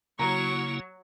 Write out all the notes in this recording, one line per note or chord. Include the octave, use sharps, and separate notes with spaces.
C#3 F#3 A#3 E4 A#5 C#6